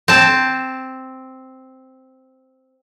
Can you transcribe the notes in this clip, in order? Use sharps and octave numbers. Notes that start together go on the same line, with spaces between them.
C4 A5